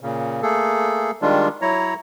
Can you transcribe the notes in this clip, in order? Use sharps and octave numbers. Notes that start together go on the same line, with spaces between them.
A#2 C#3
A3 A#3 G#4 A4
D#3 G3 G#3 D4 F4
F#3 E4 C#5 A#5